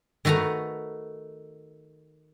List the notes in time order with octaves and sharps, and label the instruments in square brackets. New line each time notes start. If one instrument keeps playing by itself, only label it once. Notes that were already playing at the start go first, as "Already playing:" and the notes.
[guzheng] D#3 A3 F#4 B4 A#5